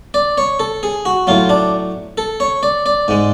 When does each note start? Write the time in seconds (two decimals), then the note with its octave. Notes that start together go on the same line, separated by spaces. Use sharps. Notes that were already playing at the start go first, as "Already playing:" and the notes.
0.14 D5
0.38 C#5
0.60 A4
0.83 G#4
1.05 F#4
1.27 A2 F#3 F4
1.49 D4
2.18 A4
2.40 C#5
2.63 D5
2.86 D5
3.08 G#2 G#3